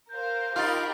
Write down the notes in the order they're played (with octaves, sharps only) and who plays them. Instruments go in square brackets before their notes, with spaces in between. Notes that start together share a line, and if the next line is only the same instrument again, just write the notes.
[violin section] A#4 C5 F5 [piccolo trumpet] G6
[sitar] D#4 F4 [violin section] G4 A#4 B5 [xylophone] F6 A6